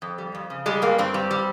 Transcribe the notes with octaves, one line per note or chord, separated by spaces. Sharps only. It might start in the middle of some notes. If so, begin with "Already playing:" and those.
F2
G3
F2
C#3
G3 G#3
G2 A#3
G2 C4
G3
G3